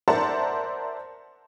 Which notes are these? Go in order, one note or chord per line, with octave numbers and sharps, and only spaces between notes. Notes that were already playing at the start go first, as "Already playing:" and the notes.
A#4 C5 D5 E5 F#5 A5